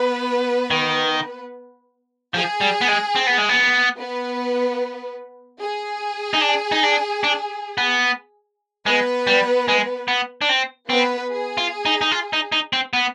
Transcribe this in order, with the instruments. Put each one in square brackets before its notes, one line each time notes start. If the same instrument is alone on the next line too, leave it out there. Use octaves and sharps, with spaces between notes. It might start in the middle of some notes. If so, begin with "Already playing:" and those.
Already playing: [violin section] B3 B4
[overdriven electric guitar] D#3
[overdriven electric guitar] F3 [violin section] G#4
[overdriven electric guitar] G3
B3
G#3
C4
B3
G#3
B3
[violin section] B3 B4
G#4
[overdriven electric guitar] D#4
D4
D#4
D4
D4
B3
[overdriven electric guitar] G#3 [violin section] B3 B4
[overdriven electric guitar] G3
G#3
B3
D4
C4
[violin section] B3 B4 [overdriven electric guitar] C4
[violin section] G#4
[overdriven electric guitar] F4
D#4
D#4
F4
D#4
D#4
C4
B3